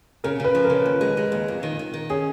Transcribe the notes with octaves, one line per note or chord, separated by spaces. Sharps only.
C#3 A#4
C#3 B4
F3
A#4
C#3
D#2
G#3
G#3
D#2
F2
D#3
D#3
D#3
C#4 G#4